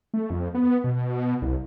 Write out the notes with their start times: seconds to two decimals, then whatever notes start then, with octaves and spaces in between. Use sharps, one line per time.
0.14 A3
0.30 F2
0.54 B3
0.84 B2
1.42 C2